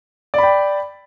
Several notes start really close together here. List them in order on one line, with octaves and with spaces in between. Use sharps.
D5 B5 G5